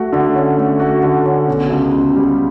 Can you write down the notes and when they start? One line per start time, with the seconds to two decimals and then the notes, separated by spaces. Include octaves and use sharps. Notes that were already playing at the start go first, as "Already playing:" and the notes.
Already playing: A3 F#4
0.13 D3
0.35 C#4
0.58 A3
0.80 F#4
1.03 D3
1.26 C#4
1.48 B2
1.70 C#2
1.92 C#2
2.16 G3